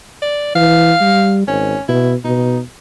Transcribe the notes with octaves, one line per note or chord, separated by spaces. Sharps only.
D5
E3 F5
G3
G#1 C#4
B2 E4
B2 D#4